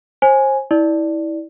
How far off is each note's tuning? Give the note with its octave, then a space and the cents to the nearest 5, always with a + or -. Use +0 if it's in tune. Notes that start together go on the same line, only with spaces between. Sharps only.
C5 +35 G#5 +0
E4 -25 D5 +0